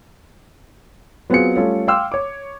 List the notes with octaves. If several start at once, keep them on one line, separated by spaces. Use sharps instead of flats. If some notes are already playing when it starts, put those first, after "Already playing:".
F#3 B3 C4 F4 G#4 C#7
G3 A3 C#4 F4 A4
F5 G5 C6 D6 E6 F6
C#5 D6